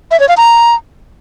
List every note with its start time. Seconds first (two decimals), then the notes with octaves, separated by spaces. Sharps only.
0.11 E5
0.20 C#5
0.29 F5
0.37 A#5